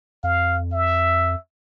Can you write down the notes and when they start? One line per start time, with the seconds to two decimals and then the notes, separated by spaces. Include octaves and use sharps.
0.24 F2 F5
0.72 E5